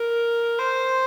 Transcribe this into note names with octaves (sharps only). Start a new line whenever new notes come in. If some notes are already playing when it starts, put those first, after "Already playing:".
Already playing: A#4
C5